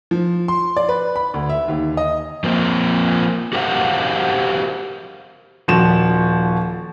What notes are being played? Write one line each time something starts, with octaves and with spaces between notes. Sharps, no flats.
F3
C6
D5
B4
B5
D2
E5
D#2
D#5
F3 A#3 C4
F#4 G4 A#4 C5 F5 F#5
D#1 F3 F#4 E7